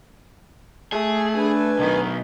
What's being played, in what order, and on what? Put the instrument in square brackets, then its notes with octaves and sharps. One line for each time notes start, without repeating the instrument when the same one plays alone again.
[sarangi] A3 [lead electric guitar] G#4
[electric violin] D4 [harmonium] B4 G#5
[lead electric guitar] B1 B2 [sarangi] D#3